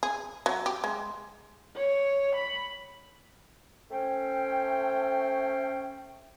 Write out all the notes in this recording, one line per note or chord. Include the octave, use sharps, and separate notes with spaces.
G#4
F#3
G4
G#3
C#5
B5
A3 C#4 C5 G5